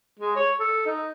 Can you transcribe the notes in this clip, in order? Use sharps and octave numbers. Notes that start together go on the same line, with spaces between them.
G#3
C#5
A4
D#4